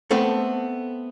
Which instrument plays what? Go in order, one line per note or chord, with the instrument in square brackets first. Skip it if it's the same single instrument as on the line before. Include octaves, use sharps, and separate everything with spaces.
[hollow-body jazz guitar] A3 B3 C4 A4